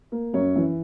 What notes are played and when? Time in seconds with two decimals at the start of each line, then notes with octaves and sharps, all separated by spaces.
0.12 A#3
0.34 F#2 C#5
0.56 E3